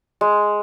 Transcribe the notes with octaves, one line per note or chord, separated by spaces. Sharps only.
G#3